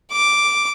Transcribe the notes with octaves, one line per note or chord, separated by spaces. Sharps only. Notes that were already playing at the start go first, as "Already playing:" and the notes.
D6